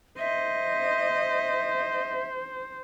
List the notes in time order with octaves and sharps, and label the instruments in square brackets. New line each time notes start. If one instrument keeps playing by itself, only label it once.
[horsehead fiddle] C5 [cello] D#5 [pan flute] E5